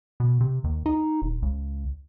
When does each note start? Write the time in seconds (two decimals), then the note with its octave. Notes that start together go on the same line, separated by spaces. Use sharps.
0.20 B2
0.41 C3
0.64 D#2
0.86 D#4
1.22 D#1
1.42 C#2